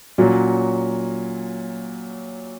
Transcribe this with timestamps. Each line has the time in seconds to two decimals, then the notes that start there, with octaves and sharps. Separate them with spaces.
0.18 A#2 F#3 C#4 F#4